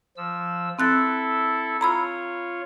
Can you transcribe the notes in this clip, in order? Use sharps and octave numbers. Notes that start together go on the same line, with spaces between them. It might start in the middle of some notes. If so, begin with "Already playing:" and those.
F3 E6
C4 E4 A4 F#6 A6
F4 C#5 A#5 B5 E6